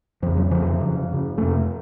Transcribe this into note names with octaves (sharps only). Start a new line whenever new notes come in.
F2 C#3 F3
F#3
F2 C#3 F3
F#2 C#3
F#2 C#3
F2 C3 A3